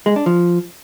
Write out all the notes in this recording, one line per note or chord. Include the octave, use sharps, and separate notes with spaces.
G#3
D4
F3